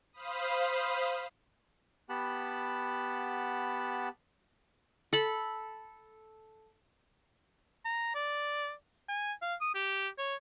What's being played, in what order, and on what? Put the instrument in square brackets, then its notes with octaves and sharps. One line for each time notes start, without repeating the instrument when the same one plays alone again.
[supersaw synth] C5 F5 B5 D#6
[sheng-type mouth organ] B3 G4 F#5 A5 B5
[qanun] A4 B5
[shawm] A#5
D5
G#5
F5
D#6
G4
C#5